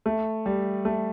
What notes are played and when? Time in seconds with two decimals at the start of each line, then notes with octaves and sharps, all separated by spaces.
0.06 A3
0.46 G3
0.85 A3